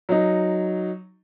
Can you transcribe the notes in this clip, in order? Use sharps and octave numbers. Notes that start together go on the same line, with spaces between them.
F#3 D#4